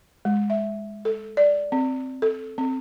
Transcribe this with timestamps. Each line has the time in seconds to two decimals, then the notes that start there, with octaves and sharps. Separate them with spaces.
0.25 G#3
0.50 E5
1.05 A4
1.37 D5
1.72 C4
2.22 A4
2.58 C4